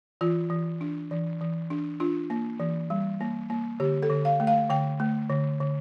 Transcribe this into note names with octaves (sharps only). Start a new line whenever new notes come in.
E3 F4
E3
D4
E3
E3
D4
D4 F4
A#3
E3
G3
A#3
A#3
D3 G4
A4
D3
F5
A3
F5
D3 G5
A3
D3
D3